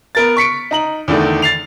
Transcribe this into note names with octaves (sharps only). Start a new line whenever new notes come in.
B3 A#4 A6
C#6 B6 C#7 D7
D#4 A#5 F#7
E2 D3 D#3 A3
A6 C7 F7